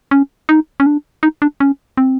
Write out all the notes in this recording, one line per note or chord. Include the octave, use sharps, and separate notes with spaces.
C#4
D#4
C#4
D4
D#4
D4
C#4
C4